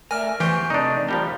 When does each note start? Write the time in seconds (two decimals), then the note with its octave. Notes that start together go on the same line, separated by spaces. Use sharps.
0.11 A3 A#4 D5 E5 G#5 F6
0.40 E2 E3 G4 C5 G5 C#6
0.70 C3 A3 D4 D#4 D5
1.08 E2 F3 G3 A#4 G5 A#5